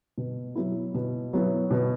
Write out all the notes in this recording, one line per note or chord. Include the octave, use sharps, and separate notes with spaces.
B2
F#3 B3 E4
B2
F#3 B3 E4
B2